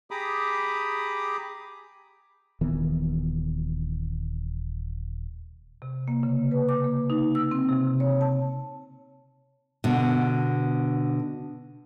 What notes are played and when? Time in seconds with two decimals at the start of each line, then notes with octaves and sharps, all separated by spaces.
0.11 G4 G#4 A#5 B5 D6 D#6
2.61 D#1 D#3 E3 B3
5.82 C3
6.08 A#3
6.23 C#3
6.51 B4
6.69 D6
6.84 A#3
7.10 D#4
7.35 E6
7.51 C4
7.69 C3
8.00 C#5
8.21 A5
9.84 B2 D3